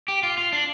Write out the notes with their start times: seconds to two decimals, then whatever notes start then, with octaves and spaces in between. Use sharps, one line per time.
0.08 G4
0.23 F4
0.38 F4
0.53 D4